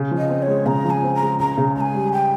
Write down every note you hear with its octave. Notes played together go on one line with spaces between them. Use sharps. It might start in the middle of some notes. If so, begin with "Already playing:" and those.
Already playing: C#3
F3
D#5
C4
C#5
G#3
C#3 A#5
F3
G#5
C4
A#5
G#3
C#2 A#5
C#3
C#2 G#5 A#5
G3
G5